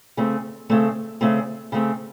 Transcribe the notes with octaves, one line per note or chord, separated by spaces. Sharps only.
C#3 A3 C4
C#3 A3 C4
C#3 A3 C4
C#3 A3 C4